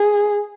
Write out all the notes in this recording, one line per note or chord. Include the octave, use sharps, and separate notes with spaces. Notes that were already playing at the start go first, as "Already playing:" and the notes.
Already playing: G#4